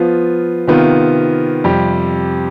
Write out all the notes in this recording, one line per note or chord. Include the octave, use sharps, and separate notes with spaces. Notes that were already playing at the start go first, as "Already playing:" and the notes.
Already playing: F3 B3 F4
C3 D#3 B3 F4
F2 C3 G3